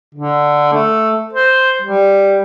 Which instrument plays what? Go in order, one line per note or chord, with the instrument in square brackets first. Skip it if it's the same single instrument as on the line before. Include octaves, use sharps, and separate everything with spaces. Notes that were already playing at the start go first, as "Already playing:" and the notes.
[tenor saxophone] D3
A3
C5
G3